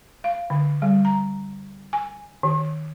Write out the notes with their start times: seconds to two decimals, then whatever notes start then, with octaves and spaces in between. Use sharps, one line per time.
0.24 F5
0.50 D3
0.82 G3
1.05 A#5
1.93 G#5
2.43 D#3